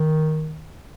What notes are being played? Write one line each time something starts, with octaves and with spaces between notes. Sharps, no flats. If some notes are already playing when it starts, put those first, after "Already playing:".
Already playing: D#3